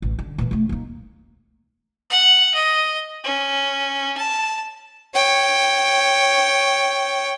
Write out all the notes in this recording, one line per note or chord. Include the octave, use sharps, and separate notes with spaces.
A1
D3
A#2 E3
E1 A3
A#3 D#4
F#5
D#5
C#4
A5
C#5 G5